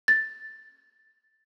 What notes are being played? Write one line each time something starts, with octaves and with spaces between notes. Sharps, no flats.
A6